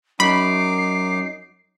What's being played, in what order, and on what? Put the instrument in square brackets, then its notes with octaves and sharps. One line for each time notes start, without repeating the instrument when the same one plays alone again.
[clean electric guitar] F#2 [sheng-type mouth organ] D#4 D6 [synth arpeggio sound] B5 [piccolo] C7